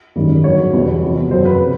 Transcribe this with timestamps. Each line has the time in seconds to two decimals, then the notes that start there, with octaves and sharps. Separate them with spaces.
0.16 G#1 F#2 D#3 G3
0.44 G1 G2 D3 F#3 C#5
0.73 E2 B2 G3
1.02 F2 C3 F3
1.31 F#1 F#2 C#3 F#3 C5
1.45 B4
1.61 C3